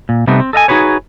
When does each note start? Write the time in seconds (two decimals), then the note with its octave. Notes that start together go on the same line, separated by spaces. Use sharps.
0.09 A#2
0.27 C3 G3 A3 B3 D#4
0.40 C4
0.53 A4 D#5 F5 G#5
0.68 D#4 F#4 G#4 B4 C#5